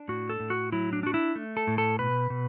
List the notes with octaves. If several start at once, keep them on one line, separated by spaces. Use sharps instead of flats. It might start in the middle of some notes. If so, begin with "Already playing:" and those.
Already playing: D4
A2 F#4
A4
A2
F#4
F#3 E4
D4
D4 F#4
E4
A3
A4
A2
A4
B2 B4
B2